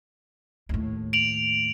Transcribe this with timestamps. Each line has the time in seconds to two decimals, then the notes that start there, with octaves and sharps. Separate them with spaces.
0.69 D#2 A2
1.13 D7 F7 F#7